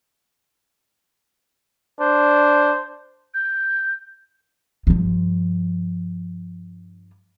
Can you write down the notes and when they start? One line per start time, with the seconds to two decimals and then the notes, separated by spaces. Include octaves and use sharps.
2.01 D4 C5
3.34 G6
4.87 G2 F3